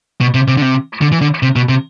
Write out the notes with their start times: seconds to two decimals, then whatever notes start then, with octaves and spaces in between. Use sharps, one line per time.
0.21 B2
0.34 C3
0.48 C3
0.57 D3
0.62 C3
1.01 D3
1.12 E3
1.21 D3
1.43 C3
1.56 B2
1.69 C3